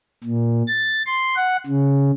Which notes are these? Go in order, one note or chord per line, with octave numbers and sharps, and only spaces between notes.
A#2
A6
C6
F#5
C#3